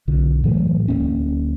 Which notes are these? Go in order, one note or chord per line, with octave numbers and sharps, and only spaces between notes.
B1 D3
A2 E3 F#3 A3
D1 G1 A#3 C#4